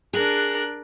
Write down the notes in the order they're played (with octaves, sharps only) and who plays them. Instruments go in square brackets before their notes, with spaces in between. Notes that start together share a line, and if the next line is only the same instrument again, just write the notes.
[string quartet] D4 A#4 F#6 [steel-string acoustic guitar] G#4